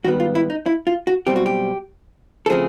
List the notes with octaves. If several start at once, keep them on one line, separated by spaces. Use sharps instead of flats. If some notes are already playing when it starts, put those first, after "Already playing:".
G#2 D#3 G3 B3 F#4
F4
E4
D#4
E4
F4
F#4
B1 B2 G3 C4 G4
F#4
G4
A4
C#3 F3 A3 C4 G#4